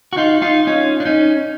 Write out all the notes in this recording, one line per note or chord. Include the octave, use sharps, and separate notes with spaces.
F#4
D#4 F4
D#4 F4
C#4 D#4
D4
C#4 D#4